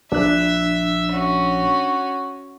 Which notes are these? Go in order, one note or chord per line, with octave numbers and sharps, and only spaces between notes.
A#1 D4 E5 F#6
C#4 F#4